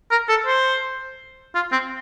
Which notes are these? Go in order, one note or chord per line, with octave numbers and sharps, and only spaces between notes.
A#4
A4
C5
F4
C4